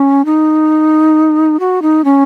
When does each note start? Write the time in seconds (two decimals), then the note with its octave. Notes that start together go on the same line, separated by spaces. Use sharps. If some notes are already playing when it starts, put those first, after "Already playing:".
Already playing: C#4
0.25 D#4
1.60 F#4
1.82 D#4
2.04 C#4